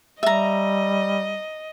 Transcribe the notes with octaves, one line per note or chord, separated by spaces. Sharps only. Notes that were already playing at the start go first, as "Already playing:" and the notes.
G3 D#5 E5 A#5